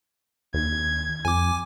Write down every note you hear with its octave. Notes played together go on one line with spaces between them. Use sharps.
D#2 G#6
F2 G#5 D6